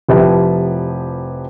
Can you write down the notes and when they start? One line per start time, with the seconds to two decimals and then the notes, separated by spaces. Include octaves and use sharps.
0.09 F1 F3 E4 G4 B4